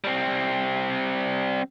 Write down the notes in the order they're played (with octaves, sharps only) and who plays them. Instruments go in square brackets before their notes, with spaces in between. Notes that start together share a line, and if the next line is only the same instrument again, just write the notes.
[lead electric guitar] G3 C4